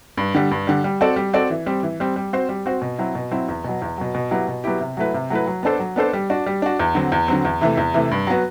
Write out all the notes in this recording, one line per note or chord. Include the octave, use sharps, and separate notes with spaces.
G2
D3 G3
G2
D3 G3
G3
C4 F#4 A4 D5
G3
C4 F#4 A4 D5
E3
G3 C4
E3
G3 C4
G3
C4 F#4 C5
G3
C4 F#4 C5
B2
F#3 C4 E4
B2
F#3 C4 E4
E2
B2 F#3
E2
B2 F#3
B2
F#3 B3 E4 G4
B2
F#3 B3 E4 G4
C3
F#3 A3 E4 B4
C3
F#3 A3 E4 B4
F#3
B3 D4 A4 C5
F#3
B3 D4 A4 C5
G3
D4 F#4
G3
D4 F#4
E2
D3 F#3 C4
E2
D3 F#3 C4
E2
C3 E3 A3
E2
C3 E3 A3
G2
F#3 B3 F#4